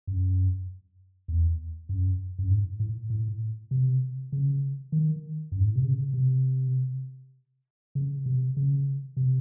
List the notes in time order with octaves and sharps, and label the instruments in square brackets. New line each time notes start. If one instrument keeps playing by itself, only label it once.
[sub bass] F#2
E2
F#2
F#2
G#2
A2
A2
C3
C#3
D#3
F#2
G#2
A2
C3
C#3
C3
C#3
C3
C#3
C3